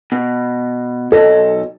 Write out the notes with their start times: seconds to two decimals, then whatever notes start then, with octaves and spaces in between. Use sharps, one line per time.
0.12 B2
1.12 B1 A4 D#5